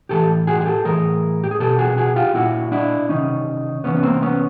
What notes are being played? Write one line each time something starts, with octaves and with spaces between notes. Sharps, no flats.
A2 E3 G4 A4
F#4 G#4
G#4
G4 A4
A2 E3 G#4 A#4
G4
G#4
B2 G4 A4
F#4 G#4
F#4 G#4
F4 G4
A#2 E4 F#4
D4 E4
C3 D#3 C#4 D#4
C3 E3 B3 C#4
B3
A#3 C4
B3 C#4